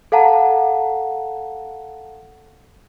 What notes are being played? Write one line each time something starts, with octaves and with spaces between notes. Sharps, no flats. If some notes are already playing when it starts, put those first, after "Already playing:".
A4 F5 F#5 A5 A#5